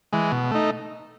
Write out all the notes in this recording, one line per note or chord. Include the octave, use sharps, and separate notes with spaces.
E3 G#3
B2
A3 D#4